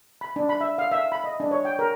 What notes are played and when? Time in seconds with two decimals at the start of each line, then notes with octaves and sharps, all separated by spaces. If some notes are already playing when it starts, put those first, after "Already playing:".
0.21 B5
0.36 D4
0.49 B5
0.61 E5
0.78 F5
0.91 E5
1.12 B5
1.24 D#5
1.40 D4
1.51 C#5
1.65 G5
1.79 A#4